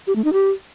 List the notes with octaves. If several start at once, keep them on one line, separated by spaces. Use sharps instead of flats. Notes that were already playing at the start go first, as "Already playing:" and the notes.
G4
A3
D#4
G4